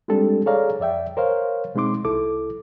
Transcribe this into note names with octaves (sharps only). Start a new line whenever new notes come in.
G3 G#3 C4 D4 G4 A4
G#4 A4 C#5 D5 F5 A#5
F2 D5 E5 G5
A#4 C5 C#5 F5
B2 G#3 C4 D#4 C6 D6
C2 E4 A4 D6